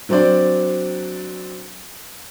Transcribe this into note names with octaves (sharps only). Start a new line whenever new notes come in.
F#3 C4 D4 C5 D5